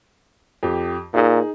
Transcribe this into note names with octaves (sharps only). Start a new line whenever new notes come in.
F2 G4
A#2 D#4 G#4